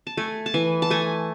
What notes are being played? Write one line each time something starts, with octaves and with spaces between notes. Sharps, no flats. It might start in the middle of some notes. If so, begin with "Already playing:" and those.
A5
A3 G#5
A5
E3 G#5
A5
A3 G#5